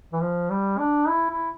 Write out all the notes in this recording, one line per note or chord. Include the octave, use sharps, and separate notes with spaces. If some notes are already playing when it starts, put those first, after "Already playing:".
E3
F3
G3
D4
E4
E4